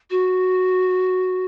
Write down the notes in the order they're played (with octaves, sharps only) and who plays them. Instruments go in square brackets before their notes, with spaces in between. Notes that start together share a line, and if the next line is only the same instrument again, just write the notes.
[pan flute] F#4